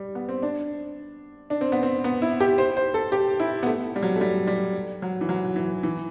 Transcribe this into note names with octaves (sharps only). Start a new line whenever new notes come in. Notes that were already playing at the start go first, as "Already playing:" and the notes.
Already playing: G3
B3
C4
D4
D4
C4
B3
C4
B3
E4
G4
C5
C5
A4
G4
E4
B3
A3
G3
F#3
A3
G3
G3
F#3
E3
F#3
E3
E3